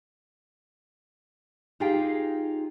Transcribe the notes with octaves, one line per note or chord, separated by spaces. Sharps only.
D#4 F4 G4 G#4 F5 G5